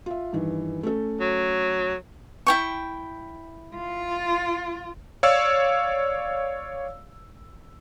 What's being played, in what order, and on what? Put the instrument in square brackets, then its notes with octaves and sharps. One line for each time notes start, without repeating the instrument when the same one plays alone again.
[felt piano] F4 E5
G2 D#3 E3
A3 C#4 A4
[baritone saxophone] F#3
[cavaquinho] E4 G5 C#6
[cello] F4
[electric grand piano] C#5 D5 F5 E6